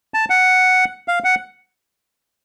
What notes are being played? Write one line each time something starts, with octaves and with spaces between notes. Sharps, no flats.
A5
F#5
F5
F#5